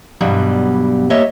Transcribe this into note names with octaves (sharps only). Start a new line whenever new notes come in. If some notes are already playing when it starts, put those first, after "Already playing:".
G2 B2 E3 F#3 G3
A#3 G4 C#5 D#5 E5